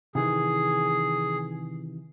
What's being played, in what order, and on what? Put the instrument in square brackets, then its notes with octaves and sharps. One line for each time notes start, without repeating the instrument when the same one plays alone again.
[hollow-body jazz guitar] C3 D#3 E3 [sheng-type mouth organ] G#4